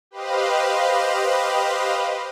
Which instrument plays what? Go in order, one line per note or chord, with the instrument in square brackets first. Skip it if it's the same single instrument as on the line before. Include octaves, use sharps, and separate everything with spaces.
[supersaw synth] G4 B4 C5 D#5 F5